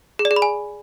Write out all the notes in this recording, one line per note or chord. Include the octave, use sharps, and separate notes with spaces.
G#4
D5
G#4
B5
G#5